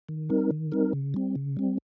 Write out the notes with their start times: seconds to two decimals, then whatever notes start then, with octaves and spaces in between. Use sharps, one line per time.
0.09 D#3
0.29 G3 C4 D#4 A#4
0.51 D#3
0.72 G3 C4 D#4 A#4
0.93 C#3
1.14 G3 C4
1.36 C#3
1.57 G3 C4